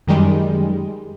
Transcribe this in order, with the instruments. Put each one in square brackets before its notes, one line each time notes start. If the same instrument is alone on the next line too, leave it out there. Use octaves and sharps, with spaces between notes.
[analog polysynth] F#2 D#3 G3 G#3